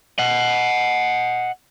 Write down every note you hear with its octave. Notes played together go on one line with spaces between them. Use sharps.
D#5 F#5